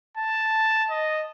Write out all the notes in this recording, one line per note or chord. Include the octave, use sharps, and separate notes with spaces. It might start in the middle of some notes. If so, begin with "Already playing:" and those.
A5
D#5